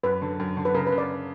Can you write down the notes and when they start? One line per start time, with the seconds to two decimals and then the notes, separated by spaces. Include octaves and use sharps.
0.03 F#2 B4
0.22 D3
0.40 F#2
0.57 D3
0.65 B4
0.74 C#3 A#4
0.87 B4
0.92 C#3
0.98 D5